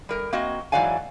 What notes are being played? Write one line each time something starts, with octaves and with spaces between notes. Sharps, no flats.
G3 A#4
A#3 C4 F#4 D#5
G#2 E3 F#3 D5 F5 G#5